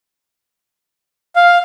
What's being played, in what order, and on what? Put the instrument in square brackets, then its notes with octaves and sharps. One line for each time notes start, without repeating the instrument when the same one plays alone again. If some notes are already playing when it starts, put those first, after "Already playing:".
[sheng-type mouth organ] F5